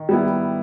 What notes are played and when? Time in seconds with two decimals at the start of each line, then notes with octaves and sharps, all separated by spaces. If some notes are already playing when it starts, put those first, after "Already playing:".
Already playing: D#3
0.09 G3 B3 E4